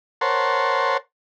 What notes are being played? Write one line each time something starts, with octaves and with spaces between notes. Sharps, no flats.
A#4 C5 C#5 F#5 A5 C6